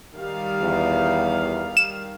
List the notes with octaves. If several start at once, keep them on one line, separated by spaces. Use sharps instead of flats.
D#3 G3 F5
E2
E7